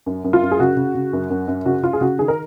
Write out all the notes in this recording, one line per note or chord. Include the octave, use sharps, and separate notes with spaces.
F#2
F#2
F4
F#2
G#4
C#3 F#4
C#3
C#3
F#2
F#2
F#2
C#3 F#4
C#3 F4
G#4
C#3 F#4
D#3 G#4
A#4